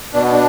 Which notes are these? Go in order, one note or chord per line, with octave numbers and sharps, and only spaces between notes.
B2 D4
B3
D4